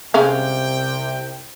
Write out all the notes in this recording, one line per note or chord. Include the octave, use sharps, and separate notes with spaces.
C2 C3 G#3 C#4 F5 G5